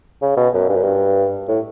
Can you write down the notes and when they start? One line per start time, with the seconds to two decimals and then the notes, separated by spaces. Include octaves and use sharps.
0.22 C#3
0.37 B2
0.53 F#2
0.69 G2
0.77 F#2
0.84 G2
1.48 A2